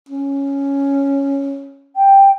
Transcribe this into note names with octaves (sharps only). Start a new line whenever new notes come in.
C#4
G5